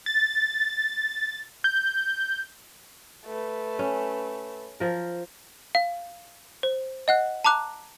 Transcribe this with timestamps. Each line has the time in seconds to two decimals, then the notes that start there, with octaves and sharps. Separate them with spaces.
0.06 A6
1.64 G6
3.26 A3 B4
3.79 C#4
4.80 F3 A#4
5.75 F5
6.63 C5
7.08 D#5 F#5 F#6
7.44 A5 A#5 D6 F#6